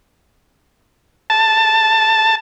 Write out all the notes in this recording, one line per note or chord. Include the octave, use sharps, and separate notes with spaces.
A5